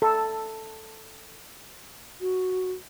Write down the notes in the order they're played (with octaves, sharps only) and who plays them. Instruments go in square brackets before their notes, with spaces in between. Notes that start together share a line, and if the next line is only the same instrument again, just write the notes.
[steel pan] A4
[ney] F#4